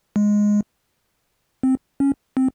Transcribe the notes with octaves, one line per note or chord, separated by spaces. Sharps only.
G#3
C4
C#4
C4